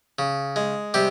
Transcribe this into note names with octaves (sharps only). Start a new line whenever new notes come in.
C#3
G#3
C3 G3 G4